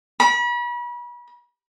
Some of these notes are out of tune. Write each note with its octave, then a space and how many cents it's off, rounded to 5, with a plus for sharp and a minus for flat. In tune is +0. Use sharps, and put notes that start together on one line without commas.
B5 -35